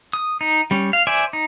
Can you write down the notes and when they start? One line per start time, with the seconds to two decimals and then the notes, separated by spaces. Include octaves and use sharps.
0.13 D#6
0.41 D#4
0.71 G3 C#4
0.93 F5
1.07 C5 D5 E5 G#5
1.33 D#4